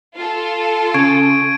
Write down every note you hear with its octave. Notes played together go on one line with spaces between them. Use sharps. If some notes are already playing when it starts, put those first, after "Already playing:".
F4 A4
C#3 C#6 G#6 D7